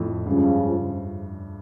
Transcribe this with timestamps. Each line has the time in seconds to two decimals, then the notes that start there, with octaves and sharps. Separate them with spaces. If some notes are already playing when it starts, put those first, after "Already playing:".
Already playing: F2 A2
0.26 C#2 G2 C#3 F3